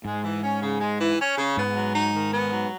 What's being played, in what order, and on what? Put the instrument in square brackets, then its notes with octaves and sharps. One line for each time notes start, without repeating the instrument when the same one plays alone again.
[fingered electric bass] G#2 [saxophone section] G#3
[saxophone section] E3
C#4
C#3
G#3
E3
C#4
C#3
[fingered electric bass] G#2 [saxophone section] B3
[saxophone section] F#3
D#4
D#3
B3
F#3